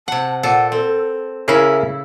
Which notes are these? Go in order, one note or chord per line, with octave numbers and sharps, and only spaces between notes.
C3 F#5 A5
A#2 A4 F#5
C4 A4
C#3 C#4 E4 G#4 A#4 E5